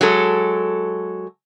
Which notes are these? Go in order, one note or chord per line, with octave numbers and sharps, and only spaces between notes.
F#3 G#3 A4